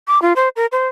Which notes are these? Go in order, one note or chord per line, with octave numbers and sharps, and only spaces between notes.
D6
F4
C5
A#4
C5